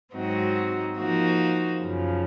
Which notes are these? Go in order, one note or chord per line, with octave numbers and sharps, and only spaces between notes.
G#2 F#3 C4 D#4 F#4
F3 A#3 D#4 F#4 C5
F#2 C#3 F3